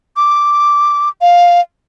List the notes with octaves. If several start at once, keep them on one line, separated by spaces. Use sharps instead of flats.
D6
F5